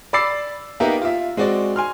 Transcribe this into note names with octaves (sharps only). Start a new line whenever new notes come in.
D5 B5 D6 E6 A6 C7
A#3 B3 D#4 G4 A#4 E5
F4 E5
G#3 C4 F#4 D5
G#5 C6 F6